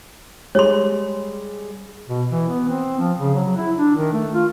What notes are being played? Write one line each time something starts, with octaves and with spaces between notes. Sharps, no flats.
G3 G#3 C#5 C6
B2
E3
B3
C4
F3
C#3
F#3
E4
D4
D#3
A3
F4